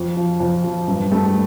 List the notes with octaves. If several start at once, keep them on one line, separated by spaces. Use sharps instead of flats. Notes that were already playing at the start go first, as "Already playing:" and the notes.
Already playing: F2
F3
F2
F3
G2
G3 A3